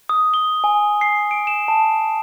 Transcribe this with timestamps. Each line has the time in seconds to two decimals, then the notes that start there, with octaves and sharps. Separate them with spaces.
0.09 D#6
0.34 G7
0.64 G#5
1.01 C7
1.31 D7
1.47 E7
1.68 A5